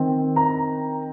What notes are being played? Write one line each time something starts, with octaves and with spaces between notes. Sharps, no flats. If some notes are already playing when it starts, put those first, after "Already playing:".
Already playing: D#3 C4
A#5